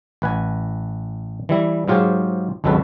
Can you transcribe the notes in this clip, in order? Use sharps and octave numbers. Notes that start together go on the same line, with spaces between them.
A1 B4 F#5 G#5
E3 G3 E4
G#2 F#3 F4 G4 G#4 C5
G#1 C#2 F#3 G#3 A4 B4